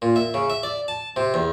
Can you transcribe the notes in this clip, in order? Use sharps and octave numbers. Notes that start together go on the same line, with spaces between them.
A#2
E5
C#3
E5
D5
A5
C3
E2